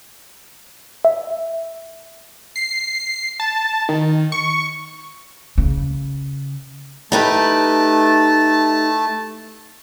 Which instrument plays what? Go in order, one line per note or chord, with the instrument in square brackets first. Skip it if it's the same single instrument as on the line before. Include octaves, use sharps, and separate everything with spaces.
[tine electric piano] E5
[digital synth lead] C7
A5
D#3
C#6
[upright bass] C#3
[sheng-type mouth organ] A3 A5 [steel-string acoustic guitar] D#4 G4 B4